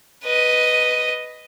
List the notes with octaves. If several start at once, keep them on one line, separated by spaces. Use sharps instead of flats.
B4 D#5